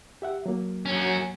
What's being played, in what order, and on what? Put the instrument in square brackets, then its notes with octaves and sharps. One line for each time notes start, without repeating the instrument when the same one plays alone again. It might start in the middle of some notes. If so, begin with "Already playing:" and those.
[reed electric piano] G4 E5 F#5
F#3 A#3
[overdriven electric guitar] F#2 C#4